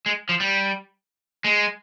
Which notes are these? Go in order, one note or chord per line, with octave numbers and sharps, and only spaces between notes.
G#3
F3
G3
G#3